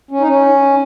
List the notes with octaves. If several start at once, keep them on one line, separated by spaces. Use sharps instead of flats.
C#4
D#4
C#4